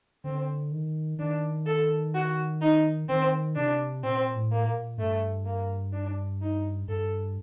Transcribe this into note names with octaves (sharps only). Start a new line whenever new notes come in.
D3 C4
D#3
D#3 D4
A4
F#4
D#4
D#3 C4
C3 D4
A#2 C4
A2
A#3
A#2
G2 A3
A#3
D4
D#4
G2 A4